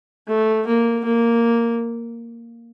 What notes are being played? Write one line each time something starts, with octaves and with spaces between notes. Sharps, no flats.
A3
A#3
A#3